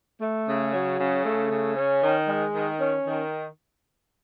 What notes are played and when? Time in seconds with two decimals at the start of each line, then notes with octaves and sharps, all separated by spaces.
0.21 A3
0.47 C#3
0.73 F#3
0.99 C#3
1.25 A3
1.51 C#3
1.77 C#4
2.02 D#3
2.28 G#3
2.54 D#3
2.80 C#4
3.06 D#3